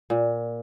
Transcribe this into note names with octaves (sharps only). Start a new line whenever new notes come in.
A#2